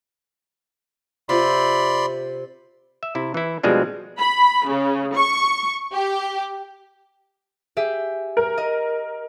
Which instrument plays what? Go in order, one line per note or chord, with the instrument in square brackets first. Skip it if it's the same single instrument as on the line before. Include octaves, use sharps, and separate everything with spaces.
[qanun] C3 F4 [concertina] D5 B5 C6
[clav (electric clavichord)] E5
C3 E4
E3 E4
B2 F3 G3 G#3 C4 D4
[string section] B5
C#3
C#6
G4
[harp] G4 G#4 E5
[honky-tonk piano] A#4
[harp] D#5